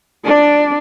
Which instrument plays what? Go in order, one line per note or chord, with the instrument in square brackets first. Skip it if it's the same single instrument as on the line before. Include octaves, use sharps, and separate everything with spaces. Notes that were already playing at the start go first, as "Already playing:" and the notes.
[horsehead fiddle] D4 D5